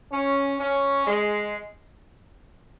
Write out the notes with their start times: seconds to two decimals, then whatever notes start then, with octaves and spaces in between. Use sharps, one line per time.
0.12 C#4
0.59 C#4
1.07 G#3